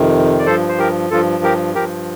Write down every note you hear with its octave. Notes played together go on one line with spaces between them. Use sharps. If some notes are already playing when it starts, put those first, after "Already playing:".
Already playing: F2 C3 D#3
D5
G2 F3 A4 C5
C5
G4 A#4
G2 F3 F4 A4
G4 A#4
G2 F3 G4 A#4